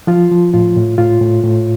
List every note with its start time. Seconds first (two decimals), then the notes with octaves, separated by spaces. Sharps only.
0.07 F3 F4
0.31 F3
0.53 A2 F4
0.76 A2
0.98 A2 F4
1.21 A2
1.44 A2